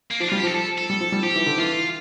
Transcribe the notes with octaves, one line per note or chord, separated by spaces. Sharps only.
A#3
F3 D4
G3 F4
G4
F3 A4
A4
A4
G3
F3
G3
F3 G4
E3
D3
E3 F4